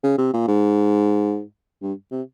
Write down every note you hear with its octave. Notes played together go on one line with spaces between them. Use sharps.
C#3
C3
A#2
G#2
G2
C3